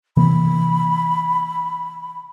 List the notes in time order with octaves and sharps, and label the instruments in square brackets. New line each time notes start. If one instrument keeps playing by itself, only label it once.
[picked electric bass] C3 E3 A#3 [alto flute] B5